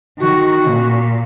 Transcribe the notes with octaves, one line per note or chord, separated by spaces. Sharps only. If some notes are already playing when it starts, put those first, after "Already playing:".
D#3 F#4
A#2